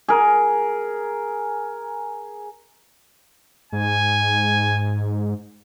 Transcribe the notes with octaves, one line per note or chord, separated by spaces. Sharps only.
G#4 A#4
G#2 G#5